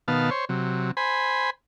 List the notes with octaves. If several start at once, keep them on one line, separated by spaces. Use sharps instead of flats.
B2 D#3 B3 F5 A5
C5 C#5
C3 F#3
C5 G#5 B5